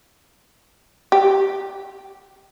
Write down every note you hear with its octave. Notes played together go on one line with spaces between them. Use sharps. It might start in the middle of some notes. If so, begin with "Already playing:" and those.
G4